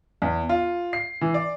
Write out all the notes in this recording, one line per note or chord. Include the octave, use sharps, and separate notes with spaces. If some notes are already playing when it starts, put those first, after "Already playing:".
E2
F4
C7
E3
D5